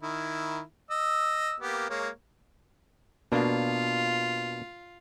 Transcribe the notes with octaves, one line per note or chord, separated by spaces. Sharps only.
D#3 E4
D#5 E6
A#3 B3 G4
G#3 A#3 C#5
B2 A#3 D4 F4